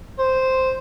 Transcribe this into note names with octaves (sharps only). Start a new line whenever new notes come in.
C5